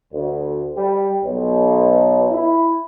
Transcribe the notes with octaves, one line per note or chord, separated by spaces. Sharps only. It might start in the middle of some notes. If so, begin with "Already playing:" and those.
D2
G3
B1
E4